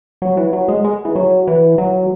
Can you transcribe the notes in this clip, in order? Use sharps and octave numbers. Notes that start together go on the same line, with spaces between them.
F#3
E3
F#3
G#3
G#3
E3
F#3
E3
F#3